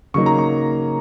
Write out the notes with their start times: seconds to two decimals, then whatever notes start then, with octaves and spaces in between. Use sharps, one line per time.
0.14 C#3 F#3 A#3 D#4 C#6
0.26 A#5
0.39 C#6